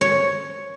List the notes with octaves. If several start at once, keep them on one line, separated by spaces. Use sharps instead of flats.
C#5